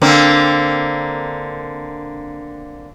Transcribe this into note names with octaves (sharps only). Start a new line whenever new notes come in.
D3 A#3 C4